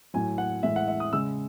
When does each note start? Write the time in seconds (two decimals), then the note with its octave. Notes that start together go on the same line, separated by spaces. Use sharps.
0.14 A2 F#3 G#5
0.38 F#5
0.63 A2 E3 G#3 E5
0.76 F#5
0.88 E5
1.00 D#6
1.13 C#3 G#3 E6